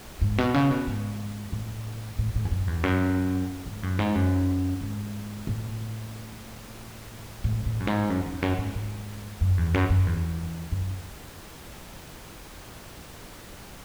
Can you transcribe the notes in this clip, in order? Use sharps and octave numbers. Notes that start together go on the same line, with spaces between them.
G#2
B2
C#3
B2
G#2
A2
A2
A2
E2
F#2
E2
F#2
G#2
F#2
G#2
F#2
G#2
A2
A2
A2
F#2
G#2
F#2
E2
F#2
G#2
G#2
F#2
E2
F#2
F#2
E2
F#2